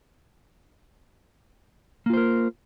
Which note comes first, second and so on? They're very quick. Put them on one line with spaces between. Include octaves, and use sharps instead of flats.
A#3 F4 C5 A#4